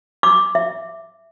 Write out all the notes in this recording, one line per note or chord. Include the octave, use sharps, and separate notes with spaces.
D6
E5